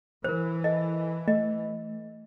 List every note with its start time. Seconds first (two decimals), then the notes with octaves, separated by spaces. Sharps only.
0.24 E3 A#4 C5
0.64 A4 D#5
1.28 A3 D#5